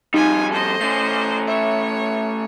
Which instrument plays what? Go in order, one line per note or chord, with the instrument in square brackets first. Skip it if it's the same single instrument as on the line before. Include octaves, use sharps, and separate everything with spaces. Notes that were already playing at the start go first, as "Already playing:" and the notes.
[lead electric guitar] F2 G3 [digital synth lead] D#4 [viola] F4 G#5
[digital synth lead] A4 [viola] C5 D#5
[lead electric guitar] A3 C#4 [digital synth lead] C7
[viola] C#5 [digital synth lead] E5